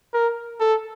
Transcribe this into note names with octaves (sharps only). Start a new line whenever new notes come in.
A#4
A4